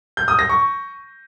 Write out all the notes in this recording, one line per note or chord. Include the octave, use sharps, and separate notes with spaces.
G6
D#6
A#6
C#6